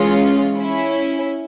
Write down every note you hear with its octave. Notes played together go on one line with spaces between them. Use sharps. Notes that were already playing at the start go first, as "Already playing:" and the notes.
Already playing: E3 G#3 C#4 F4
C#4 E4